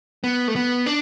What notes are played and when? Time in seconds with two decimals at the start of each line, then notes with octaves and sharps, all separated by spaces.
0.24 B3
0.48 A3
0.56 B3
0.86 D4